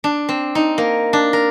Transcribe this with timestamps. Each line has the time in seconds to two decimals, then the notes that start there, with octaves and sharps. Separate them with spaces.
0.04 D4
0.29 C4
0.55 D#4
0.78 A#3
1.13 D4
1.33 A#4